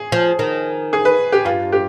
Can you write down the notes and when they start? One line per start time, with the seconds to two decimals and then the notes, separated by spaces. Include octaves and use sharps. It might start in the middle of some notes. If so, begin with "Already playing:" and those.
Already playing: G#4
0.12 F3
0.39 D#3
0.93 G#4
1.05 B4
1.32 G4
1.45 G2 F4
1.72 G4